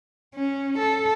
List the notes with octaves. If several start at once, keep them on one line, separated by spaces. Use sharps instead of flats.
C#4
A4